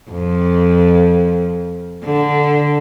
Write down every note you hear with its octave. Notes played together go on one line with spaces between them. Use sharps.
F2
D3